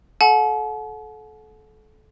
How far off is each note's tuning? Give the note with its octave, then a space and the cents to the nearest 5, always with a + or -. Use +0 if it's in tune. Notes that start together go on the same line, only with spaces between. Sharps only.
A4 -30 F#5 -30 A5 -45